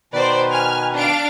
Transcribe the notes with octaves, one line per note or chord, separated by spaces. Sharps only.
B2 D#3 B4 C5 D5
G#5 F6
D4 F5 D7